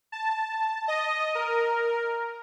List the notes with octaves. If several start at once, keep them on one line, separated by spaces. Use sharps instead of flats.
A5
D#5
A#4